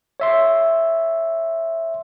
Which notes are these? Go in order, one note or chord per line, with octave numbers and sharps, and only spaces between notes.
C#5 E5 C6